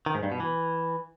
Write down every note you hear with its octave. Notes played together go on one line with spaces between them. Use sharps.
D#3
G#2
G2
B2
E3